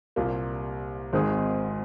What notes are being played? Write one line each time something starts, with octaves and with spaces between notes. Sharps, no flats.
C2 A#2 A#3
G#1 G#2 D#3 C4 G#4